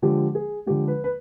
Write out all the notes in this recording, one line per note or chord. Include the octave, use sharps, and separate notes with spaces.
D3 F3 G#3 G4
G#4
D3 F3 G#3 G4
B4
B4